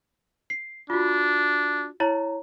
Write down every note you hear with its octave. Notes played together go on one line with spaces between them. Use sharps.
C7
D4 F4 F#4
E4 C#5 A#5